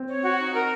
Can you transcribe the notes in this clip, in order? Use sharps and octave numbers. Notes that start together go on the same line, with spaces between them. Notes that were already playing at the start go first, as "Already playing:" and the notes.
Already playing: C4
C#5
F#4
D#4
A#4